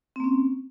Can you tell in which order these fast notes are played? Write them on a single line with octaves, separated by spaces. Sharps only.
C4 A#3 C#4